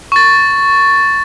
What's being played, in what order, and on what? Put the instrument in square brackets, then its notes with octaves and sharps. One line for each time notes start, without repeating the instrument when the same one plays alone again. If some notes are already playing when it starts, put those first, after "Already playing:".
[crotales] C#6 A6